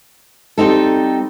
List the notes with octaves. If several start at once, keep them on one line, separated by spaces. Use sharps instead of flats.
G3 C4 D#4 A4